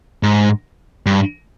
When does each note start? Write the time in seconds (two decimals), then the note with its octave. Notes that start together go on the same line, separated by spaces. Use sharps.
0.23 G#2
1.06 G2